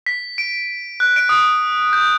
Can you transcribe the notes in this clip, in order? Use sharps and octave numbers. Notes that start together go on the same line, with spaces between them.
B6
D7
F#6
D7
D#6
G6